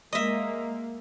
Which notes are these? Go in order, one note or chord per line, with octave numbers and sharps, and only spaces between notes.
G#3 A#3 D#5 E5